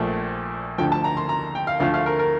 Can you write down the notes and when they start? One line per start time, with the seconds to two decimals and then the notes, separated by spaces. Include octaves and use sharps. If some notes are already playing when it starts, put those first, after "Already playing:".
Already playing: A#1 A#2 F3 A3
0.78 D2 D3 F3 G5
0.92 A5
1.04 A#5
1.17 C6
1.29 A#5
1.55 G5
1.67 F5
1.80 D2 D3 F3 A3 F5
1.94 F5
2.06 A#4
2.19 A#4